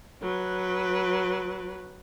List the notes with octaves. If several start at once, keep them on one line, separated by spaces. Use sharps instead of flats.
F#3 B4